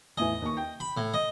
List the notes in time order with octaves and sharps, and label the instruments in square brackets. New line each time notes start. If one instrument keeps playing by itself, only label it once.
[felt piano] E2 A2 G#5 [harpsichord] D#5
[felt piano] D#2 C#6
G5
[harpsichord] B5
A2
D#5